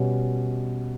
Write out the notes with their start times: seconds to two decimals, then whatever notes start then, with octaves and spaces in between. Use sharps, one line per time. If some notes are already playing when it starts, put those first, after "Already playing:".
Already playing: B2 G3 C#4